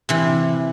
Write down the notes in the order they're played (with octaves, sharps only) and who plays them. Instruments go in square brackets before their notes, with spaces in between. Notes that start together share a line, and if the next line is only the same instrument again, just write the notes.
[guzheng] C3 E3